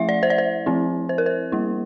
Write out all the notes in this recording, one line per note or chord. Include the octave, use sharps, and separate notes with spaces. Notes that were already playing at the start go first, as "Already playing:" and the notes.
Already playing: F3 A3 E4 E5
D5
C5
D5
C5
F3 C4 E4
C5
A#4
C5
G3 A#3 E4